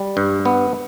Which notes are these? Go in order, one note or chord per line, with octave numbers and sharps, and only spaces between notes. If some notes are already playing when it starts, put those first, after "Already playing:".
Already playing: G3
G2
B3